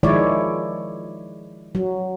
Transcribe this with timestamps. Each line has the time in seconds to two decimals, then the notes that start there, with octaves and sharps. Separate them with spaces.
0.03 D#3 F3 G#3 E4 C#5 D5
1.75 F#3